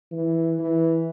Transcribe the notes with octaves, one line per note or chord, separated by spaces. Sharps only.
E3
E3